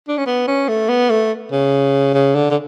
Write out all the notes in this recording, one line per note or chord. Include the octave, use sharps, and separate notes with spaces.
D4
C#4
B3
C#4
A3
B3
A3
C#3
C#3
D3
D3